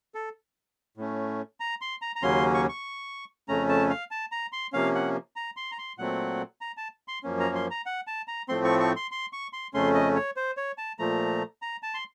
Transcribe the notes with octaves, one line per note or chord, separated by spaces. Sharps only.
A4
A2 A3 C#4
A#5
C6
A#5
A#5
D#2 C#3 F#3 A#3 C#4 C6
C#6
C#6
F2 C#3 A3 C#4 A#5
A5
F5
A5
A#5
C6
C3 F3 A#3 C#4 F5
F#5
A#5
C6
A#5
C6
A#2 F#3 A3 C4 F#5
A#5
A5
C6
F#2 F3 A#3 C#4
A#5
C6
A#5
F#5
A5
A#5
A2 F3 A3 C4 C6
C#6
C#6
C6
C6
C#6
C6
F2 C#3 A3 C#4 C6
D#5
C#5
C5
C#5
A5
A#2 F3 A3 A#5
A#5
A5
C6